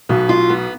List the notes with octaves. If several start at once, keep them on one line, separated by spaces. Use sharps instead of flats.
B1 B2 B3
F4
B3